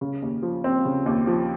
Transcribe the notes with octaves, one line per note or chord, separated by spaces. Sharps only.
C#3
D#2
F3
C4
C#3
D#2
F3